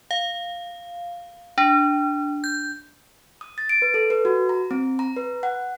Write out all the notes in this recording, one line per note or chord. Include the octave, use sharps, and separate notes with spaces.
F5
D4
G6
D#6
A6
D7
B4
A4
B4
F#4
A#5
C4
A#5
B4
F#5